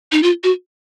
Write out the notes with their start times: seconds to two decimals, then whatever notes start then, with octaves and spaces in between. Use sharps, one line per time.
0.12 D#4
0.23 F4
0.44 F#4